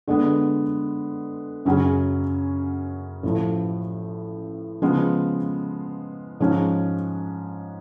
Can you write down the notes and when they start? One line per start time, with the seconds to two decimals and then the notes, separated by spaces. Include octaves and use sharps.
0.08 D3 G#3 B3
1.65 F#2 C#3 F#3 C#4 G#4
3.23 A1 A2 F3
4.82 C#3 F3 G#3 B3 F4
6.40 G#2 F3 G#3 C#4